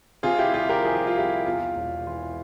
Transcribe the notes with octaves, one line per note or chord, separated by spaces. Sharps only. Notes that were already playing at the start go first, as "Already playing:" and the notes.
C3 F4 G#4
E4 G4
C2 F4 G#4
G4 A#4
F3 G#4
G4
F4
C2 E4 G4
E2 F4
E1
E3 F4